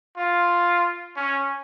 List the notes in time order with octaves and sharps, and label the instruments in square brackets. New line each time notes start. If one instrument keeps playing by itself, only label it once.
[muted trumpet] F4
C#4